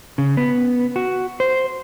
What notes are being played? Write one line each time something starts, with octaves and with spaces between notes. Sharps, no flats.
C#3
B3
F#4
C5